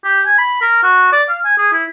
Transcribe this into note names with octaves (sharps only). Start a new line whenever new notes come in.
G4
G#5
B5
A#4
F#4
D5
F5
G#5
G#4
E4